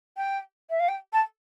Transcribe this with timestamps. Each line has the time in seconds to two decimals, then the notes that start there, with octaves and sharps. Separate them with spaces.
0.17 G5
0.70 E5
0.79 F5
0.88 G5
1.13 A5